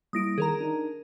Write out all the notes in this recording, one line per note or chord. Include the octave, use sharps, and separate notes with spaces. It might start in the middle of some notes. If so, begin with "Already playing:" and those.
G3 A#3 E4 D#6 A#6 D7
D#3 G#4 A#4 A#5
D4 D#4